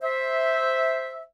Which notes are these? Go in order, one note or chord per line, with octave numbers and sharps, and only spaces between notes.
C5 E5